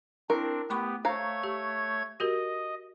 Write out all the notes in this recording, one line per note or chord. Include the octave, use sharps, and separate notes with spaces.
C4 D4 E4 A#4
A3 B3 G4 B5 C#6
A3 C5 C#5 F5 A#5 G#6
G4
F#4 G4 A#4 D#5